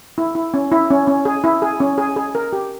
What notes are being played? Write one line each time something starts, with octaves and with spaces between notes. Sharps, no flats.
E4
E4
C#4
E4
C#4
C#4
G#4
E4
G#4
C#4
G#4
G#4
A#4
G4